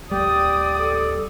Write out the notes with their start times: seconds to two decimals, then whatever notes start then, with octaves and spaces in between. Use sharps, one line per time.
0.11 D1 D#2 G3 D5 G5 D#6
0.78 A4